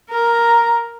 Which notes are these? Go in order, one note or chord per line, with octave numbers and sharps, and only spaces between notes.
A#4 A#5